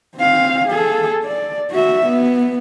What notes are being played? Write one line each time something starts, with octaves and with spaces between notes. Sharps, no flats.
C4 F5
G#4 A4
D5
F#4 E5
B3